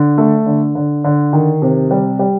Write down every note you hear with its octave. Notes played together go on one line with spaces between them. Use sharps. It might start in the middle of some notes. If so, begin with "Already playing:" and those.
Already playing: D3
A3
D3
D3
D3
D#3
C3
G3
G3